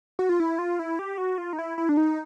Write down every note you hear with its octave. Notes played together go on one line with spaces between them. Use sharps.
F#4
F4
E4
F4
E4
G4
F#4
F4
D#4
E4
E4
D4
D#4